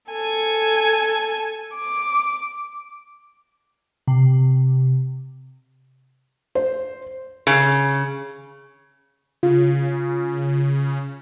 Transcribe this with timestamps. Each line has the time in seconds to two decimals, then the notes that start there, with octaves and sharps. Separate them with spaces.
0.11 A4 G#5
1.75 D6
4.08 C3
6.55 C5
7.47 C#3
9.43 C#3 F4